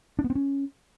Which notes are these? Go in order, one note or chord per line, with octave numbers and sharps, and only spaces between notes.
D4
B3
C4
C#4